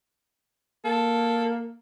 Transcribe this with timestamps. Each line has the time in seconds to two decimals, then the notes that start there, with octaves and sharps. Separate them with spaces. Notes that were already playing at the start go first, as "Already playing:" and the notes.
0.85 A#3 A4